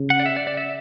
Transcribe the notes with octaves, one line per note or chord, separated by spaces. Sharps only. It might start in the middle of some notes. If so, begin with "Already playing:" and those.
Already playing: C#3
F#5
D5
E5
D5
D5
E5